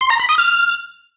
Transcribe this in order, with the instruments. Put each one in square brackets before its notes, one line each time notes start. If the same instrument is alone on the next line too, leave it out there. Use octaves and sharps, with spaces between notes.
[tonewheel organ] C6
A#5
B5
D#6
F6